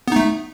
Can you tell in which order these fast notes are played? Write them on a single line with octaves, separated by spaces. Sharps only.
B3 D#4 A3